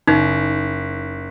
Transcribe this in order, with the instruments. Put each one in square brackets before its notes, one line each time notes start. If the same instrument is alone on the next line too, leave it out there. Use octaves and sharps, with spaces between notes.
[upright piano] F#1 [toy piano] D#4